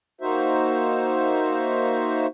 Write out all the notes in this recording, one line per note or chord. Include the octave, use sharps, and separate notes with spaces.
A#3 D#4 F#4 C5 E5